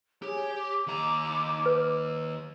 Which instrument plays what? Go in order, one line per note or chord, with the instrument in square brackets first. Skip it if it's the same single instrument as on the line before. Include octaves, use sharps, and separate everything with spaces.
[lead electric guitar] G4 [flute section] G#4 C#5
[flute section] D6
[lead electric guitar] D#2 A#5
[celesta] B4